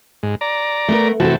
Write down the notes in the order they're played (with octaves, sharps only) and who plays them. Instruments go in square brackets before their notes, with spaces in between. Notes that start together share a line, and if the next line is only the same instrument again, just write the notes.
[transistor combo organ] G#2
D5 A#5
[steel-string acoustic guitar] A3 B3 A#4
[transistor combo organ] C3 E3 A3 [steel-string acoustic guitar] F#4 A4